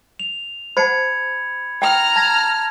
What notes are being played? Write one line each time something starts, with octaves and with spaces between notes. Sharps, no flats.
F7
C5 F#5 A5 B5 G#6 C#7
G5 A#5 F6
A5 G#6 A#6